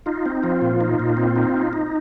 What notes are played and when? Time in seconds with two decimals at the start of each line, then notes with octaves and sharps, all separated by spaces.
0.06 D#4 F4
0.26 C4
0.43 F3 F4
0.61 A#2
0.81 D#4
0.99 A#2
1.17 C4
1.36 D#4
1.54 D#4
1.73 D#4